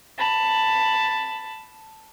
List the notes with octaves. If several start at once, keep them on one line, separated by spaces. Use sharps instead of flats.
A5 B5